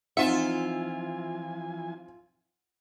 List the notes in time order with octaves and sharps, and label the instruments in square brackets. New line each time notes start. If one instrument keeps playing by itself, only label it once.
[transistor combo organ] E3 F3 G#5 [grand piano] C4 D#4 [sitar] F4 E5 [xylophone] F#5